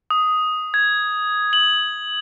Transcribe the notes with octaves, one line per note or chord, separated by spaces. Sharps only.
D#6
G#6
F#7